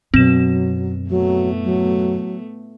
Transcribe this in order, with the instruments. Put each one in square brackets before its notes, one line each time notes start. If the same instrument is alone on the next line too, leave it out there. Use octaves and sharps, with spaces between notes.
[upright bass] F#2 B2 [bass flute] F#3 [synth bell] C4 E7
[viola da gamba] A2 A3 B3 [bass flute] F#3
[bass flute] F#3